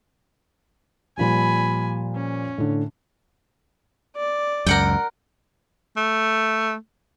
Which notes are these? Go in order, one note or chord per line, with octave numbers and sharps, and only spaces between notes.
A#2 F3 G3 G#5 B5
C#4
A2 D3
D5
C#2 F#2 A#4 F#5 G5
A3